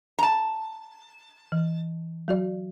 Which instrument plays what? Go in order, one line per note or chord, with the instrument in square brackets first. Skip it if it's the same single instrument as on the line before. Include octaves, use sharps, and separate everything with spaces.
[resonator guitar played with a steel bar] A5 A#5
[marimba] E3
F#3 F#4 D5